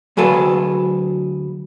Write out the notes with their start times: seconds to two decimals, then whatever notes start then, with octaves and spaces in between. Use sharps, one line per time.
0.17 D2 F#3 G#4 A4 B4